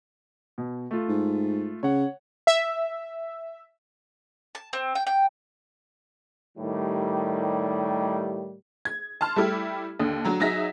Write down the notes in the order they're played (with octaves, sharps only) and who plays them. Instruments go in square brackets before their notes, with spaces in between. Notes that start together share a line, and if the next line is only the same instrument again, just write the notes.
[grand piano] B2
A3 F4
[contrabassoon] G#2
[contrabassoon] C#3 [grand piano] C#5 F#5
[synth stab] E5
[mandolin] A5
C4
G5
G5
[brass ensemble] A2 D#3 G3
[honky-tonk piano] G#6
A5 C6 F6
G3 A3 E4 G4
D#2 D3
D3 F#3 A#5
F#3 D#4 G#4 E5 A#6 B6